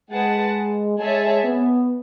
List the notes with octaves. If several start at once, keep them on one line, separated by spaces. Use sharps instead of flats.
G#3 G#4 B4 F#5 A5
G#3 G#4 C#5 E5 A5
B3